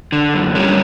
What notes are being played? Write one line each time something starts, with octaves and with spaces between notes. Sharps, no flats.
D3
F#2
G3 C#4